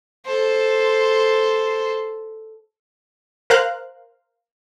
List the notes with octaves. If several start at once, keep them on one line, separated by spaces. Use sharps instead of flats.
A4 C5
A#4 C5 F5 F#6